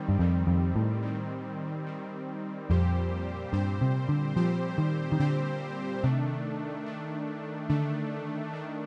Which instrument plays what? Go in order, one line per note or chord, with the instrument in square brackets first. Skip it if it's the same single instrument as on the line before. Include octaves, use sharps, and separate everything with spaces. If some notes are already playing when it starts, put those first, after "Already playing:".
Already playing: [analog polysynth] D#3 G3 C4
[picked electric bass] G2
[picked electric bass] F2 [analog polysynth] D#3 G3 C4
[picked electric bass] F2
A2
[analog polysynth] D#3 G3 C4
D#3 G3 C4
[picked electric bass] F2 [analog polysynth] A#2 G3 C4 G4 C5
[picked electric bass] G2 [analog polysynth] A#2 G3 C4 G4 C5
[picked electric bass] C3
D3
[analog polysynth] A#2 G3 C4 G4 C5 [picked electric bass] F3
[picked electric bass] D#3
D#3
[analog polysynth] A#2 G3 C4 G4 C5 [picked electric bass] D3
[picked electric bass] C3 [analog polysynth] D#3 A3 D4
[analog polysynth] D#3 A3 D4
[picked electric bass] D3 [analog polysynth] D#3 A3 D4
[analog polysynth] D#3 A3 D4